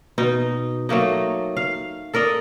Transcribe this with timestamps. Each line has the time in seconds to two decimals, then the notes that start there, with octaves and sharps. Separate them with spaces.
0.18 B2 D#4
0.89 F#3 A3 A#3 D#4
1.57 F5
2.14 A4 A#4 D5 D#5